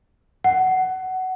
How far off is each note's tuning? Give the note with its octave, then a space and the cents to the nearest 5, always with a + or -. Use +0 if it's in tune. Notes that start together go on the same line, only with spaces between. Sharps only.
F#5 +15